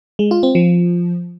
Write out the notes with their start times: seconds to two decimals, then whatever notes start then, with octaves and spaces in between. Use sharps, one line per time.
0.19 G#3
0.31 F4
0.43 C4
0.55 F3